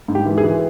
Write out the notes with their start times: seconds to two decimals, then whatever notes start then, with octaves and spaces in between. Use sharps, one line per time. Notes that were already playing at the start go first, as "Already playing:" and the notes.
0.08 G#2
0.15 G4
0.26 E3
0.38 G#4
0.43 E3